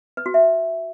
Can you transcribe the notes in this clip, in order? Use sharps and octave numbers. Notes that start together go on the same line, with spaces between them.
B4
F#4
E5